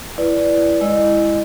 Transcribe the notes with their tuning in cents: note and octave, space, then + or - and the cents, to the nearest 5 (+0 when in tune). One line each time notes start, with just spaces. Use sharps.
E4 +20 B4 +0 D5 -10
G#3 -5 E4 +0 D#5 -30